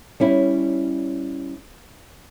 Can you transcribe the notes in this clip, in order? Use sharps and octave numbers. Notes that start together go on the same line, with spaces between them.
G3 C#4 E4